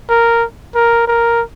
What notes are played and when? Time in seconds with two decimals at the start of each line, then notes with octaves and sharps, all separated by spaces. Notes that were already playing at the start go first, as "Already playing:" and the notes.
0.09 A#4
0.75 A#4
1.07 A#4